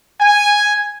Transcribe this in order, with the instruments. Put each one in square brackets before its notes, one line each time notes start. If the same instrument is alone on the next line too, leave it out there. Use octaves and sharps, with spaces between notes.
[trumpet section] G#5